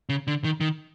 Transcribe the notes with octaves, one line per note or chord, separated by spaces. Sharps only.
C#3
D3
D#3
D#3